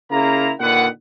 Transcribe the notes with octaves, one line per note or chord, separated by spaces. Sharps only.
C#3 A#3 E4 F4 A#5
A#2 D3 D#3 B4 F#5